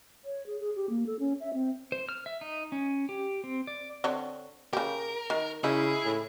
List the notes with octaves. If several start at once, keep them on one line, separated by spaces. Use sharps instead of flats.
C#5
G#4
G#4
G4
A#3
A4
C#4
E5
C4
C5
F6
E5
D#4
C#4
G4
C4
D5
D3 C4 C#5
C#3 G4 A#4
D#3
C#3 D#4 E4 G#4
A2